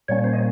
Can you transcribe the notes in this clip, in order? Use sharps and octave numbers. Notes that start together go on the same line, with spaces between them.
A#2 G3 A#3 C#4 C#5
C5
D#5